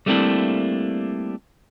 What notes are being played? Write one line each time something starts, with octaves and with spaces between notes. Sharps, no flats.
G3 A3 A#3 C4 D4 E4